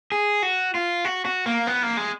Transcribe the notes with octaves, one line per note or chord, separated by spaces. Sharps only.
G#4
F#4
F4
F#4
F#4
A#3
B3
A#3
G#3